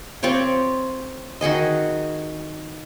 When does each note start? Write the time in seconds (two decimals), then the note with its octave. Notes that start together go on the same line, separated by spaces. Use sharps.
0.23 C4 F4 G4 C#5
1.41 D#3 F#4 G#4 D#5